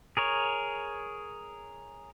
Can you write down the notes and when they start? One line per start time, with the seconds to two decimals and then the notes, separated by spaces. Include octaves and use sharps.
0.17 G#4 A#4 C#5